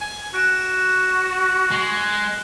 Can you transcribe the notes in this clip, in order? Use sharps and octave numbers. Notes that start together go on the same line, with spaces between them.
G#5
F#4 F#6 D7 E7
G#3